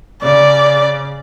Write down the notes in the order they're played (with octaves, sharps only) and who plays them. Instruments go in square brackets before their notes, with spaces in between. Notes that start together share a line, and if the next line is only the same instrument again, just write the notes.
[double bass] C#3 [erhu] D5